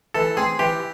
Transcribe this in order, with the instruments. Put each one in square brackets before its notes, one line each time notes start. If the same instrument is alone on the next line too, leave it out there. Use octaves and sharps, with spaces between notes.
[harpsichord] E3 [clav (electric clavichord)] A4
[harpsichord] C4 [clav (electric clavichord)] G#4
[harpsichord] E3 [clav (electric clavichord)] G4